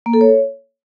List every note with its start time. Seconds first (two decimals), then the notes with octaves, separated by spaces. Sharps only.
0.06 A#3
0.13 A4
0.21 C#5